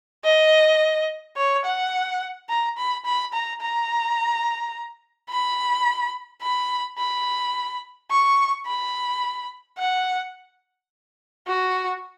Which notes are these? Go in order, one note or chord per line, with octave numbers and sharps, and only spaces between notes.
D#5
C#5
F#5
A#5
B5
B5
A#5
A#5
B5
B5
B5
C#6
B5
F#5
F#4